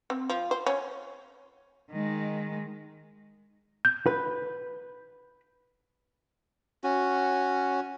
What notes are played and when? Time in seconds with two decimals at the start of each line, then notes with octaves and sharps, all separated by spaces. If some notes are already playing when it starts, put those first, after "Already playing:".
0.10 C4
0.30 F3
0.51 C5
0.67 C#4
1.91 D#3 G#3
3.85 G6
4.06 B4
6.84 C#4 F#4